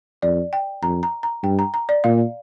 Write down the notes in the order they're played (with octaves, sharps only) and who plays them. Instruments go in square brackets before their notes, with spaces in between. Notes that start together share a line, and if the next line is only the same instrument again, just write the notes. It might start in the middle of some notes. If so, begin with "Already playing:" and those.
[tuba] F2 [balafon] D5
[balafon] G5
[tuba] F2 [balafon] A#5
[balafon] A#5
A#5
[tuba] G2 [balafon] G5
[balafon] A#5
A#5
D5
[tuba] A#2 [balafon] F5